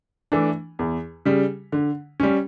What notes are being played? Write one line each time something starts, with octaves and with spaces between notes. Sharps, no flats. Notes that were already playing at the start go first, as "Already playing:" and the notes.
E3 A3 D4
E2
C#3 G3
D3
G3 C#4